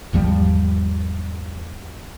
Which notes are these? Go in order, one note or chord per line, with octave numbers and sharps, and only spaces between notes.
G#1 E2 F3 G3